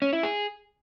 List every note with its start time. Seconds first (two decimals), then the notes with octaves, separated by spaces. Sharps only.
0.02 C#4
0.13 E4
0.23 G#4